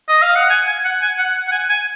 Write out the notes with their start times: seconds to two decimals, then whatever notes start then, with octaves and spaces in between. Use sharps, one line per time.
0.08 D#5
0.22 F5
0.36 F#5
0.50 G#5
0.67 G#5
0.84 F#5
1.02 G#5
1.18 F#5
1.48 F#5
1.52 G#5
1.70 G#5